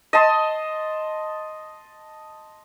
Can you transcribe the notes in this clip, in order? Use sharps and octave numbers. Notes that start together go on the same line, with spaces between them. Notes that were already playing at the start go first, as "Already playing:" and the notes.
D#5 A5 C6